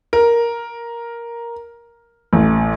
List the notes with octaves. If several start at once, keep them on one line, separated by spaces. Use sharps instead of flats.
A#4
A1